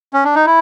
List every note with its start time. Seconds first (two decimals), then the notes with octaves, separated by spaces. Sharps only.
0.14 C#4
0.25 D4
0.35 D#4
0.46 E4